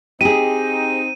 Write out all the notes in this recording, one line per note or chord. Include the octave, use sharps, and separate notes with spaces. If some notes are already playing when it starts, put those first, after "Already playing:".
C4 D#4 G4 G#4 D#7